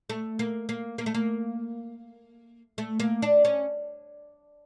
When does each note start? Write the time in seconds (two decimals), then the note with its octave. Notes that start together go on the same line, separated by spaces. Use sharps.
0.10 A3
0.39 A#3
0.69 A#3
0.98 A#3
1.06 A3
1.14 A#3
2.78 A3
3.00 A#3
3.22 D4
3.45 C#4